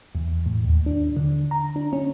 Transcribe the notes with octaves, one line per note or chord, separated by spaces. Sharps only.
E2
A2
D#2
D4
D3
A#5
D4
C#4